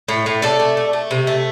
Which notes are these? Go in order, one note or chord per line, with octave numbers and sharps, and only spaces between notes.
A2
A2
C3 A4 D5
A3
A3
A3
C3
A3